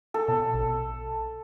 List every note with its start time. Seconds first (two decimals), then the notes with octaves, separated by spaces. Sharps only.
0.14 A4
0.28 B2
0.54 A#1